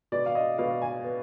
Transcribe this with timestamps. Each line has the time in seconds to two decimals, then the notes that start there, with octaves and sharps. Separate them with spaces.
0.12 B2 D5
0.26 F5
0.35 D#5
0.58 B2 F5
0.82 G#5
1.04 B3